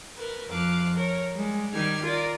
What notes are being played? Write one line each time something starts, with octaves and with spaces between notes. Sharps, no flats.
A#4 B4
F2 F3 F5 D6 F#6
A#4 C#5
G3 G#3
D#3 G3 G4 F6 G#6
F4 A#4 D5